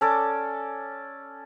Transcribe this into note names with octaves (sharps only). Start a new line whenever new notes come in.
C#4 A4 D5 D6